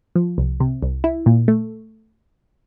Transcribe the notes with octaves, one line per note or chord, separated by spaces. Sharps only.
F3
C2
C3
C2
E4
A#2
A3